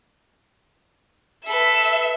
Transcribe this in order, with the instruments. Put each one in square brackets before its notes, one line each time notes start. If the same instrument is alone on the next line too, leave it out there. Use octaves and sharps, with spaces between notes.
[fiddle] A4 B4 [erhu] E5